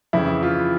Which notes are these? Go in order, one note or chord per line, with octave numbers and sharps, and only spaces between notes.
F2 C#3 E3 E4
F4